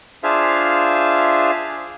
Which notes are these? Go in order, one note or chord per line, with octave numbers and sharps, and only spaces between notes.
D4 F4 G#4 C5 E5 F5